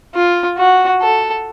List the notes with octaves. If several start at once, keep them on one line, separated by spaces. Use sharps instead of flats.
F4
F#4
A4